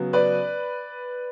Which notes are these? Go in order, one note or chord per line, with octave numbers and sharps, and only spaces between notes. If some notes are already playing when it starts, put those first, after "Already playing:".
Already playing: C#3 F#3 B3
B4 D5